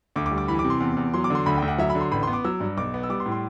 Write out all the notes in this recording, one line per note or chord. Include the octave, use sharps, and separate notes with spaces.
D2 D6
D6
G3
D6
E3 B5
D6
C3
C6
E2
E2
F#3 C6
D6
D3 C6
D2 B5
D2 G5
F#5
F#3 E5
B5
D3
C6
A1 B5
B3 C6
D6
F#3 E6
G2
B1 D6
B3
E6
G3 D6
C6
A2
C6